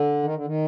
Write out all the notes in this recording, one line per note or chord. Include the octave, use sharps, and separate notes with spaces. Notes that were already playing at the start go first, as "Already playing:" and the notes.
Already playing: D3
D#3
D3
D#3